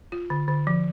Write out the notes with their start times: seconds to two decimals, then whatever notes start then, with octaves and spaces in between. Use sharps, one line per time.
0.12 F4
0.30 D3
0.48 D3
0.67 F3